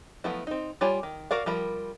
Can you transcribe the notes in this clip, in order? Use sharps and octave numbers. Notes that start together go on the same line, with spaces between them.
F3 F#3 A3 B3 E4
C4 D#4
G3 F4 C#5 G#5 B5
D#3
F#4 A#4 D5 F5
F3 G3 A#4 B5